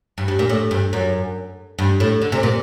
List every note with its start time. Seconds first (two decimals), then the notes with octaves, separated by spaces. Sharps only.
0.18 G2
0.28 G2
0.39 A#2
0.49 A2
0.71 G2
0.93 F#2
1.79 G2
2.00 A2
2.22 D3
2.32 C3
2.43 A#2